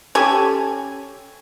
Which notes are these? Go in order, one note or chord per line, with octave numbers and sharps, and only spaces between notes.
C#4 G4 A4 G#5